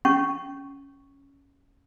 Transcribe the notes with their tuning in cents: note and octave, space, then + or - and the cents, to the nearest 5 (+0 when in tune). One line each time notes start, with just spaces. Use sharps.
C#4 +0 C#6 +0